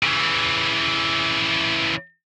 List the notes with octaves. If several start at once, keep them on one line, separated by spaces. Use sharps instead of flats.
C#3 E3